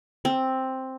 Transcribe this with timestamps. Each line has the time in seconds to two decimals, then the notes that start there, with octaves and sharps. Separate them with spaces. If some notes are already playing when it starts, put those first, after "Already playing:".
0.25 C4